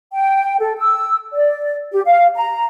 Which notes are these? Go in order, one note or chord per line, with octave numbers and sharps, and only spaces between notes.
G5
A4
E6
D5
G4
F5
A#5